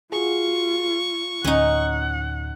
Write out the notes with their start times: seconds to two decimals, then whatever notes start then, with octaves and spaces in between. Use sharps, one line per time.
0.12 F4 F#4 G#4 C#6
1.44 D2 A2 C#4 D#4 F#5